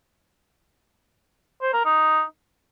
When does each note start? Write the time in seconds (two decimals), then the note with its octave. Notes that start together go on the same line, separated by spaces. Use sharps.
1.62 C5
1.74 A#4
1.85 D#4